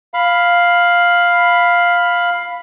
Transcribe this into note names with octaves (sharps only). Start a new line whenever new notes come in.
F5 B5